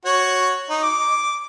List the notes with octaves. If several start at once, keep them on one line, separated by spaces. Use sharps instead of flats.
F#4 C#5
D#4
D6